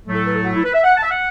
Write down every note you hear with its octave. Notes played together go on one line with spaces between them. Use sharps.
A2 F#3 A3
A4
B4
A4
F#4
E4
B4
E5
F#5
A5
E5
F#5